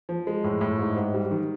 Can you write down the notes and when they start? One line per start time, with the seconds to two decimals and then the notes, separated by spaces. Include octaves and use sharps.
0.09 F3
0.27 G#3
0.44 A2
0.61 A2
0.79 G#2
0.97 G#2
1.14 G3
1.31 D#3